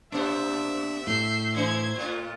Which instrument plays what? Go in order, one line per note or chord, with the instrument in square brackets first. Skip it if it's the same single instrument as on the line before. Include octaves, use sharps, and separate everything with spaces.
[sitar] B2 A#3 C5 [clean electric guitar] D4 [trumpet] E5
[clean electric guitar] A2 [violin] G6 C7
[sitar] E3 D#4 E4 [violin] C5 G#6
[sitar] A2 F4